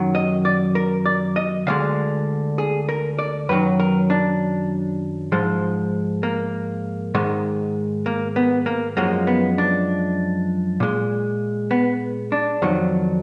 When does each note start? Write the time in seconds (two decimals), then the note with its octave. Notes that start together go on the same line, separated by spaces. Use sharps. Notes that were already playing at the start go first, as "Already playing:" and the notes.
Already playing: F#2 D#3 F#3
0.15 D#5
0.45 D5
0.75 A#4
1.06 D5
1.36 D#5
1.67 D2 D3 G#3 F5
2.58 G#4
2.89 A#4
3.19 D5
3.49 F#2 D#3 F#3 B4
3.80 A#4
4.10 D4
5.32 G#2 F3 G#3
6.23 A#3
7.15 G#2 D#3 G#3
8.06 A#3
8.36 B3
8.66 A#3
8.97 F#2 F3 G#3 A#3
9.27 B3
9.58 D4
10.80 A#2 G#3
11.71 B3
12.32 D4
12.62 F2 D#3 F#3